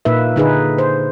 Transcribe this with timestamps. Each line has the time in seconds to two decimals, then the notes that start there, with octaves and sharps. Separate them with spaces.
0.05 A#2 A#3 D#4 B4 E5
0.36 D3 D#4 G#4 B4
0.78 C5